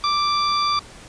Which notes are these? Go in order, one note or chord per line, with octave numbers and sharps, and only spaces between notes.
D6